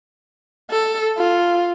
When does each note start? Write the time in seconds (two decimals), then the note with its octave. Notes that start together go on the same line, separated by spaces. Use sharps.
0.71 A4
1.18 F4